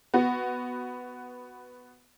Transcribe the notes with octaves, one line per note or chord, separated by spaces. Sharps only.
B3 F#4